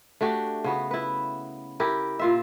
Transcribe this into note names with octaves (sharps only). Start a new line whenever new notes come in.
A3 D4 F#4 G4
C#3 B3 F#4
E4 B4
E4 G4 A#4
A#2 F4 E5